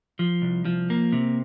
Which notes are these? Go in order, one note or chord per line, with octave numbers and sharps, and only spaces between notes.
F3
C2
F3
A#3
C3